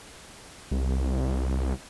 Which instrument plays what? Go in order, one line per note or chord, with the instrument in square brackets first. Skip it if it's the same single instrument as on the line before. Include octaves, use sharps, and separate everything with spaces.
[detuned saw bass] C2